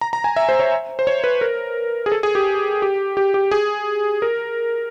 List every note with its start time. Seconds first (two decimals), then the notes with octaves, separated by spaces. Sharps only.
0.01 A#5
0.13 A#5
0.24 G#5
0.36 E5
0.49 C5
0.59 C#5
0.99 C5
1.07 C#5
1.24 B4
1.41 A#4
2.06 G#4
2.12 A4
2.23 G#4
2.35 G4
2.82 G4
3.17 G4
3.34 G4
3.51 G#4
4.22 A#4